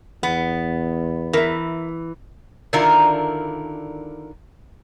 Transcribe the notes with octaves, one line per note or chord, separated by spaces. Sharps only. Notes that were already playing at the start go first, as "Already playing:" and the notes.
E2 B3
E3 A#4 E5
D3 D#3 D4 E4 F4 A#4